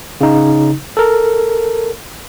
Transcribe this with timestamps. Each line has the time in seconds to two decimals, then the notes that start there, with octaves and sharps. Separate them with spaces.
0.21 C#3 D#4
0.97 A4 A#4